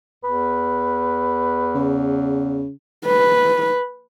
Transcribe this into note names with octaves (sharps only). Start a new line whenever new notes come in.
E2 B4
C#3
B4